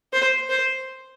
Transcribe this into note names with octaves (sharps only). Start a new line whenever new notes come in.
C5
C5